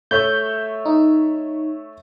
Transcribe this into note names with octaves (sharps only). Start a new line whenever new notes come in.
A3 C#5 E5 G6
D#4